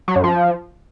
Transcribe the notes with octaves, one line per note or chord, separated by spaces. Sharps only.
F#3
F#2
F3